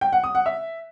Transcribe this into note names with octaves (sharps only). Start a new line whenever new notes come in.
G5
F#5
D#6
F#5
E5